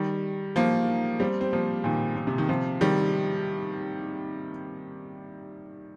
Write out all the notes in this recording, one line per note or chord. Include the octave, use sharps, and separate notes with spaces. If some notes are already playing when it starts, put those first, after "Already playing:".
Already playing: D#3 G3
F3 A#3
G3 C4
C4
F3 A#3
A#2 D#3
A#2
C3
D#3
C3 F3
D#3 G3